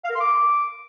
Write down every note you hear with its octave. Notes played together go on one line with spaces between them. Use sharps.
F5
A#4
C6
D6